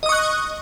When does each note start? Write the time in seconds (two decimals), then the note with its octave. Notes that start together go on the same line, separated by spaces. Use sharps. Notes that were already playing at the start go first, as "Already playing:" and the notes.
0.03 D#5
0.06 D#6
0.09 C#6
0.12 F#6